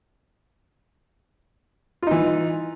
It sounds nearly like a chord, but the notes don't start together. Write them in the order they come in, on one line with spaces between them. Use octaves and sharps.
F4 D#4 E3